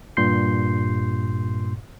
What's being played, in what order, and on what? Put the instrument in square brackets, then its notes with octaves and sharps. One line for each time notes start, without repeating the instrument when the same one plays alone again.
[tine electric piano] G2 A#2 C6 G6 C7